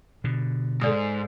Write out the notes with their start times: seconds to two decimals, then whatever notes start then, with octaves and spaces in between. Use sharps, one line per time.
0.24 B2 D3
0.81 G#2 A4 D5 D#6